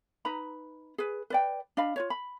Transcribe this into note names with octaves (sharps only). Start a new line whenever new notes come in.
D#4 B4 A#5 B5
G#4 B4
B4 D5 G5
D4 D#5 F5 B5
F4 C5 C#5
B5